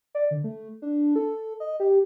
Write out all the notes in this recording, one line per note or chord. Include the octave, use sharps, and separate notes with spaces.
D5
D3
A3
D4
A4
D#5
G4